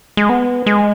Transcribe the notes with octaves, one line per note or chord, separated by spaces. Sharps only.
G#3
B3
G#3